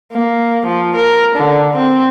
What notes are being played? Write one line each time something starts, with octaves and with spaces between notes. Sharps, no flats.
A#3
F3
A#4
D3
C4